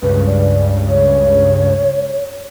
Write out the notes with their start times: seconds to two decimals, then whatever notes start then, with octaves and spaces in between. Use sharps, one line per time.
0.02 C#2 G2 C#3 B4
0.26 D5
0.89 C#5